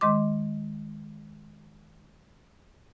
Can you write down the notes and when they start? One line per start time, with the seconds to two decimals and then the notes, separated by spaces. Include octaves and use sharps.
0.01 D#3 G#3 D#5 C6 D6